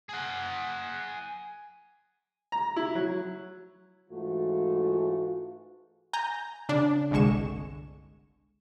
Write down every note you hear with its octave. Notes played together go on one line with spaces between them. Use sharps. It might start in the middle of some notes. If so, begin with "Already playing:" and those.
G#4 F#5
A#5
E4
F#3
G#2 E3 A3 F4 F#4
G#5 A#5 G6 A#6
C#3 D4
G1 C2 D3 G#3 C#6 E7